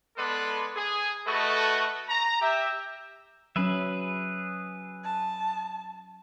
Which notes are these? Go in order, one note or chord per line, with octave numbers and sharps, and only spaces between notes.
G#3 B3 A4 B4 D5 C6
G#4
A3 F#4 A4 B4 D#5 C#6
A#5
G4 E5
F#3 C#4 G#4 B4 E5
A5